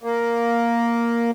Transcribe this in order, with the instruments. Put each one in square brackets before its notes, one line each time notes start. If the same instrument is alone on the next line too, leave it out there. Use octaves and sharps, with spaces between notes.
[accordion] A#3